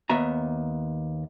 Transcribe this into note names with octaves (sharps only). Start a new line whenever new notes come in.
D#2 B3 E5 A#5